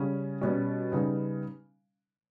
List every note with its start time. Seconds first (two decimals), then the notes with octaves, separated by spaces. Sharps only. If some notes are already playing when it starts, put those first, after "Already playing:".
Already playing: C#3 G3 C#4
0.41 B2 G3 C#4
0.92 C#3 G3 B3 D#4